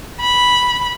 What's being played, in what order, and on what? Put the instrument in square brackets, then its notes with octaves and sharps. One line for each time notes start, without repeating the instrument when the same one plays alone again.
[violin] B5